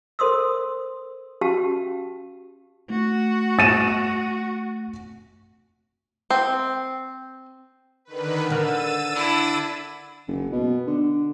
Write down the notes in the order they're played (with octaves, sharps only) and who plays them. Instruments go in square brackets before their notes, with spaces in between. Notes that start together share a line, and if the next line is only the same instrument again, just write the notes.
[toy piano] A4 A#4 C5 C6 D#6 E6
C#4 F#4 G4 F5 A5
[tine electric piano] A3 [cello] F#4
[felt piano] A6 D#7 E7
[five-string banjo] C4
[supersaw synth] D3 D#3 B4
[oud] D3 A#4 [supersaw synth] E6 A6 D#7
[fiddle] D4 E4
[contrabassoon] F#1
B2
D3